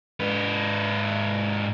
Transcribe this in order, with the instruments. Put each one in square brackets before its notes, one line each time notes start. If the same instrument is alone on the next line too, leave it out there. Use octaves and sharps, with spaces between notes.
[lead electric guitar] G#2 B4